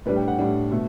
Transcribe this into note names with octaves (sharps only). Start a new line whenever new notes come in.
A2 G3 D4 B4
G5
F#5
A2 G3 D4
B2 A3